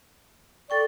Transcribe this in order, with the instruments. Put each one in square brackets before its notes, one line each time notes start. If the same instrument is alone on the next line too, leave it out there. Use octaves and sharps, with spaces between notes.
[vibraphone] A4 G5 C#6 [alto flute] D5